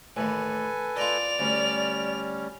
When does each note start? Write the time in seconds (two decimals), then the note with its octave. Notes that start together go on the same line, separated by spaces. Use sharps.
0.16 A1 D#2 A4 B4 G#5
0.97 F4 D5 D#5 F7
1.39 D2 G3 C#4